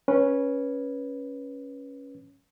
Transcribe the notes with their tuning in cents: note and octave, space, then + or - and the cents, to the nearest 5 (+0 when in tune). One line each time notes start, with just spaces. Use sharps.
C#4 +0 B4 -20